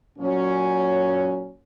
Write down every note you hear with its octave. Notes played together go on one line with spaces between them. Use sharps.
A#2 F#3 C#4